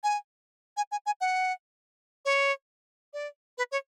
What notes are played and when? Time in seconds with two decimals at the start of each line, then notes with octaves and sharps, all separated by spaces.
0.04 G#5
0.77 G#5
0.92 G#5
1.06 G#5
1.21 F#5
2.25 C#5
3.13 D5
3.58 B4
3.72 C#5